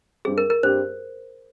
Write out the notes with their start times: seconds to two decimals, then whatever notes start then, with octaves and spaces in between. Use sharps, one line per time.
0.25 G2 G3 C4 G4 G#4
0.38 A#4
0.50 A#4
0.63 G2 G3 C4 G4 C5